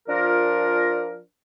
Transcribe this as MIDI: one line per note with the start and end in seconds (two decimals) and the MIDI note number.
0.08 1.18 53
0.08 1.18 62
0.08 1.18 65
0.08 1.18 70